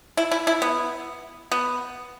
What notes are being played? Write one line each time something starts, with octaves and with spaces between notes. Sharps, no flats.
E4
E4
E4
B3
B3